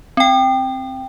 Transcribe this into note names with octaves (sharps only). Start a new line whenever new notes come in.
C4 G5